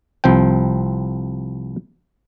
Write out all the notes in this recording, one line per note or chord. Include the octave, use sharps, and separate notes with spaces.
C2 F3 C4 G5